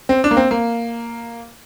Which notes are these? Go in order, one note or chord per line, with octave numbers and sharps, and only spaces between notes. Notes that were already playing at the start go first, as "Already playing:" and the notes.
C4
D4
A#3
C4
A#3